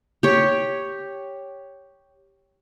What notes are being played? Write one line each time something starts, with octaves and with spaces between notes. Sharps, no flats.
G4 C#5